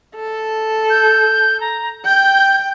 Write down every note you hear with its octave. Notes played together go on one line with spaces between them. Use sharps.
A4
G6
A#5
G5 G6